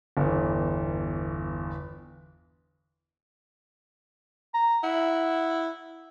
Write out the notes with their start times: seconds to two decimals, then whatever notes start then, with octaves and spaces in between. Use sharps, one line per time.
0.17 G1 E2
4.54 A#5
4.84 E4 F#5